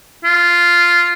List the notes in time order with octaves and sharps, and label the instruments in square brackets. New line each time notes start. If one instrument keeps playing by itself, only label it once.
[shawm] F4